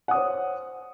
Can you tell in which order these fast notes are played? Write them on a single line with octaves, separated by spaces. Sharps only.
F#5 D#6 C#5 C5